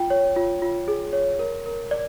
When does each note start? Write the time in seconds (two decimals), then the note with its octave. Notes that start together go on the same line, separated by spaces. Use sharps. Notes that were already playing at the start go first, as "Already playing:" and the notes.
Already playing: F4 G5
0.10 C#5
0.36 F4
0.62 F4
0.88 G#4
1.13 C#5
1.39 A#4
1.66 A#4
1.91 D5